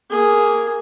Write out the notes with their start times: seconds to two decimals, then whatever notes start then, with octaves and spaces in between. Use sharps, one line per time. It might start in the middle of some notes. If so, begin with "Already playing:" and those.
0.10 A#3 G#4